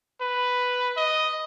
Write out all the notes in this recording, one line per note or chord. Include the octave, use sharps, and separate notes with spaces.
B4
D#5